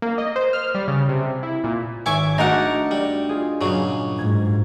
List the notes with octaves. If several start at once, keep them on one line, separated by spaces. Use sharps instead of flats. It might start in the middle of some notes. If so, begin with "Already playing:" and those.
A#3
D#5
C5
F6
G3
C#3
C3
E4
A#2
G#1 E5 G#5 C#6 D6
A3 D4 D#4 F#4 A#4 F#5
G3
F4 G#4
G2 A#2 C#3 F#3
G#2 G#6